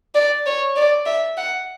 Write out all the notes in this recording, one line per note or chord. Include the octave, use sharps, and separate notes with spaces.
D5
C#5
D5
E5
F#5